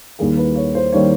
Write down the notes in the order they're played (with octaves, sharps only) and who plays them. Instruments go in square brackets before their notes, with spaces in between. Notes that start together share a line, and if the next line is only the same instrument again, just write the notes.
[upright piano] D#2 D#3 G3 A#3 G#4
B4
C#5
C5
D#3 G3 A#3 C#5